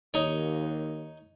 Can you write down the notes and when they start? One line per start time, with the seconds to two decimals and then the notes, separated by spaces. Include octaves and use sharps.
0.14 D#2 D#4 C#5